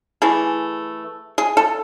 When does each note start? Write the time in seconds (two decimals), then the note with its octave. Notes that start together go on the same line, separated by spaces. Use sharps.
0.22 E3 A3 G#4
1.38 G#4
1.57 A4